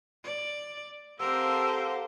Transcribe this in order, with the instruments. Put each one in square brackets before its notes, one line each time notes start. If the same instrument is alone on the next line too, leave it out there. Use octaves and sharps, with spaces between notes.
[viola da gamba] D5
[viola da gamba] C4 A#4 [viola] G4 C5 [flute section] A4 F5 F#5 [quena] E6